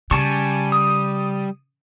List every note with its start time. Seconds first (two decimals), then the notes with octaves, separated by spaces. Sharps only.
0.11 C#3 G3 G#5 A5 C#6
0.72 D#6